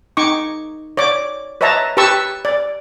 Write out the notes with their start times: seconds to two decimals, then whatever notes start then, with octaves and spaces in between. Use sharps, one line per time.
0.17 D#4 C#6 D6
0.97 C#5 D5 D6
1.61 B4 C#5 D#5 E5 A5 A#5
1.97 G4 B4 A5 C#6 E6
2.45 D5